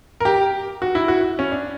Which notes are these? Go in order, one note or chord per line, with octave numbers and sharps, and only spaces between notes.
A#4
G4
F#4
E4
F#4
C#4
D4